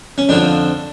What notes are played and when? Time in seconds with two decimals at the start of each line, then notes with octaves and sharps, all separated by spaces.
0.18 C#4
0.29 F2 D3 F3 D4